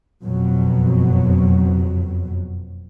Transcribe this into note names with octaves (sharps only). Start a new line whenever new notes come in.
F#1 F2 B2 F#3